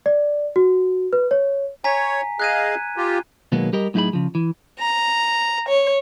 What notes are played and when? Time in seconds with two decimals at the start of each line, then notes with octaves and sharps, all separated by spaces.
0.06 D5
0.56 F#4
1.13 B4
1.31 C#5
1.84 C#5 G#5 A#5 B6
2.40 G#4 D#5 F5 F#6 G#6 D#7
2.97 F4 G4
3.52 B2 D#3 F#3 G#3 A#3 B3
3.73 G3 G4 A#4 D#5
3.94 A2 F#3 D#4 E4 G#4 B5
4.13 C#3 F3
4.35 E3
4.79 A#5
5.68 C#5